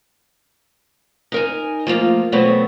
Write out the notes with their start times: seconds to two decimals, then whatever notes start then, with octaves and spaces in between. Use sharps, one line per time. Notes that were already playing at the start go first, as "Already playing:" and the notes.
1.32 D#4 A#4 G#5
1.87 F3 A3 A#3 F4
2.32 B2 E3 F#3 A3 B3 C4